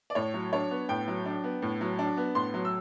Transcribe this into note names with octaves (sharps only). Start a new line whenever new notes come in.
D5
A2 C#5
F#3
D4 C#5
B3
A2 G5
F#3
D4
B3
A2
F#3
D4
B3
A2 C6
F#3
E6